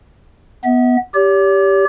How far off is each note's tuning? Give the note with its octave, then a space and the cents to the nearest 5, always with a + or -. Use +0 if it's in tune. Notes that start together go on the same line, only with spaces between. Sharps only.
B3 +0 E5 -35
G4 +0 C#5 +45